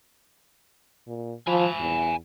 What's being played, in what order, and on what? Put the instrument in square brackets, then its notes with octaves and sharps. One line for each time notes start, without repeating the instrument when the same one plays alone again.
[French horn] A#2
[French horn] F3 [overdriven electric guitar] G#5 B5
[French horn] E2